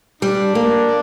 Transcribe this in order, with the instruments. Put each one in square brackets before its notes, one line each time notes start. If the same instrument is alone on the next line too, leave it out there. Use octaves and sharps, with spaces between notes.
[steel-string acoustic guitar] G3 [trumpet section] D4
[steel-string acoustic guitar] A#3